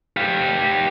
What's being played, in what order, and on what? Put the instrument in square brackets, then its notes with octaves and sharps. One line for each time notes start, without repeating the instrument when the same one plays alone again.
[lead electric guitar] G4 F5